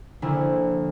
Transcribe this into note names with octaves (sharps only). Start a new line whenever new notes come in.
A#1 D3 E4